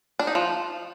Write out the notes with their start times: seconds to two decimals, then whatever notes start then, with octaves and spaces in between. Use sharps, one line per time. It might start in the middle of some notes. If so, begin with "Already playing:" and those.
0.19 D4
0.27 D#4
0.35 F3